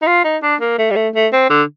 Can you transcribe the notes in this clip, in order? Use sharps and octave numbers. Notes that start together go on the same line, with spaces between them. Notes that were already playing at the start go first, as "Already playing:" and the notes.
D#4
F4
D#4
D4
A#3
A3
G3
A3
A3
C4
D3